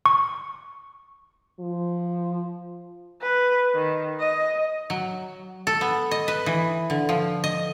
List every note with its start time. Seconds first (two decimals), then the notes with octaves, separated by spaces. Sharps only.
0.06 C#6
1.59 F3
3.22 B4
3.75 D#3
4.20 D#5
4.90 F#3
5.67 A4
5.81 B3
6.11 D#5
6.28 B4
6.46 E3
6.90 D3
7.09 F3
7.44 D#5